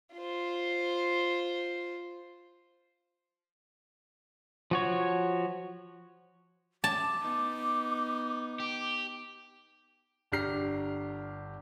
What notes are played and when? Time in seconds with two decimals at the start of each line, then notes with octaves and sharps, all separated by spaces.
0.14 F4 C5
4.71 F3 F#4 C#5
6.84 A5 D6
7.21 B3 D#4
8.60 G4
10.32 G1 D4 G4 A#5 F6 C7